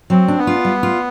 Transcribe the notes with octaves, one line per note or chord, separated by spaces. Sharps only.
F#3 C4
D4
B3
F4
G3
F4